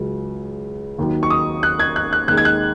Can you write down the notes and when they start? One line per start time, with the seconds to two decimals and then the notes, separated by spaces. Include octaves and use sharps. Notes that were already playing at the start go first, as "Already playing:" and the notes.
Already playing: C#2 C#3 F#3
0.99 D#2 D#3 F#3
1.23 C#6
1.30 D#6
1.63 F#6
1.80 G#6
1.96 F#6
2.13 F#6
2.28 D#2 D#3 G#3 F#6
2.38 G#6
2.45 F#6